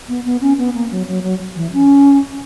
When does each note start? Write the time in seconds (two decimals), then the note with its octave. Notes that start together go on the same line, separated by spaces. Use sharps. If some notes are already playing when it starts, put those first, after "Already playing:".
0.09 B3
0.25 B3
0.41 C#4
0.58 B3
0.75 A#3
0.91 F#3
1.08 F#3
1.23 F#3
1.56 E3
1.73 C#4